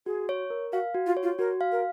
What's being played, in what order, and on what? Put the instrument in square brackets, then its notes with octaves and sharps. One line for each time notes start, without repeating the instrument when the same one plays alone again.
[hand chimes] F#4 [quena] G#4
[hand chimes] C#5
A#4
[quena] F#4 [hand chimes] F5
[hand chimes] F#4
[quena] F4
[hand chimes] C#5
[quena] F4
[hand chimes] F#4 [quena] A#4
[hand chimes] F5
[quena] A#4